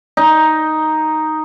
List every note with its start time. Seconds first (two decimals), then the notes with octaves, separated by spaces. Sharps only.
0.17 D#4